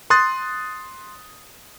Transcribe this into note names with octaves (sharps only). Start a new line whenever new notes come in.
C6 D#6 F#6 A6